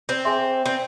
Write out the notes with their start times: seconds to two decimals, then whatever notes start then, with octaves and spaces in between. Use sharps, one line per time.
0.09 C4
0.25 G#4 E5 G#5 C6
0.66 C4